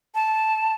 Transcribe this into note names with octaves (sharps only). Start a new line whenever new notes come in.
A5